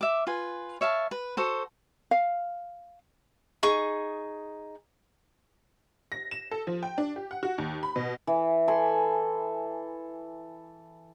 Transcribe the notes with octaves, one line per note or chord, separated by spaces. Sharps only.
E5 D6
F4 B4 G#5
C#5 E5 F5 A5
B4
F#4 A4 C5
F5
D#4 G#4 C#6
A#6
E7
A4
F3
G5
D4
G4
F#5
F#4
D#2
B5
B2
E3
A4 G#5 B5 C6